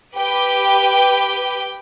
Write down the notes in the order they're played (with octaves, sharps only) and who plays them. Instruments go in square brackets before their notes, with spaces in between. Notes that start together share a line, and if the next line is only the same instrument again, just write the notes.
[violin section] G4 B4 G5